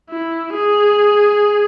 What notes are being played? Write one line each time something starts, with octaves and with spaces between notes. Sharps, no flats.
E4
G#4